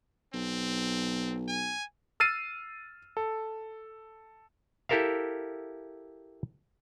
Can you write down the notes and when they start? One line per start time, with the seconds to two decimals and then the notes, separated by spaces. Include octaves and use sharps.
0.34 B1 C4
1.48 G#5
2.20 E6 F6 A6 C7 D#7
3.17 A4
4.89 E4 G4 A4 A#4 E5 F5